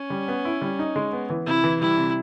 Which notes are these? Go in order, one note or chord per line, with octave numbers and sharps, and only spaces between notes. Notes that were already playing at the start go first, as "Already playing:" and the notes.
Already playing: C#4
G3
B3
E4
G3
D#4
G#3
B3
E3
C3 E4
E3
G3 E4
C3